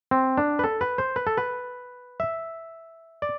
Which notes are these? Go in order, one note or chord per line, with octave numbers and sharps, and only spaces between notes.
C4
D4
B4
A4
B4
C5
B4
A4
B4
E5
D5